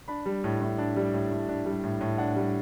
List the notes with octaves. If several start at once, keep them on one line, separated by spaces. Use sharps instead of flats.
D4 B5
G3
A2
A2
D4
G3
A2
A2
D4
G3
A2
A2
D4 F#5
G3